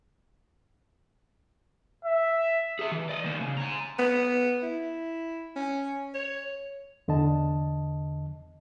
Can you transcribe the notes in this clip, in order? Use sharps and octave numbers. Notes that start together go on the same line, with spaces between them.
E5
G#4 E5
E3
D5 D#5
D#3 A#3
C#3
G#5 A#5
B3
E4
C#4
C#5
E2 D3 D#5 A5